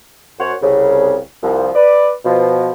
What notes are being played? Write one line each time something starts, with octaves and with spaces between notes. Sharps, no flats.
F#2 C5 C#5 F#5
C2 C#3
C2 F3
B4 D5
B2 F3